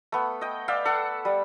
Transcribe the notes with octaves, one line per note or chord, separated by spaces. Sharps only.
A3 B3
D#5 G5
D5 E5 F5 G5
A4 F#5
G3